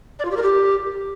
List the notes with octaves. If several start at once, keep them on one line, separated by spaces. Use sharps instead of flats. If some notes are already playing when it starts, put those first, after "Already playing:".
D5
F4
G4
A#4
G4